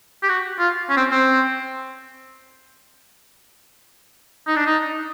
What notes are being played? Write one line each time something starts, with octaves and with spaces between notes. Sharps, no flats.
G4
F#4
F4
C#4
C4
C4
D#4
D4
D#4